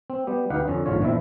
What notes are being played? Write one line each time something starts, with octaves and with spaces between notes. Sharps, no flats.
C4
G3 B3 G4
D2 D#4 G4 B4 F5 F#5
F2 D3 C#4
A#1 G#2 D3 F4 C#5
E2 A#2 D#3 F3 E4 E5